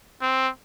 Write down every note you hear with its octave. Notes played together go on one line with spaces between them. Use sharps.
C4